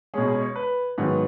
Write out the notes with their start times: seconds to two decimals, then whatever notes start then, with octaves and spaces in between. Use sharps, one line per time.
0.14 B2 G#3 C#4 G#4
0.28 G#4
0.42 C#5
0.56 B4
0.98 G#2 D#3 F#3 B3